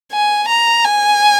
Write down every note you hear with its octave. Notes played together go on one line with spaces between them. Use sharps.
G#5
A#5
G#5